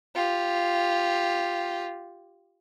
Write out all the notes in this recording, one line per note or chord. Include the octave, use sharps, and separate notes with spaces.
F4 G4